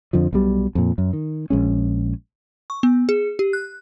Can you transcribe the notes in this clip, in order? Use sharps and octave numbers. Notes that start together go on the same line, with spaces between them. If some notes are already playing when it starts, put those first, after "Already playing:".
F2 D3 F3
B1 B2 G3
F2 A#2
F#2
D#3
A#1 G#3 C#4
C#6
B3
G#4
G4
F#6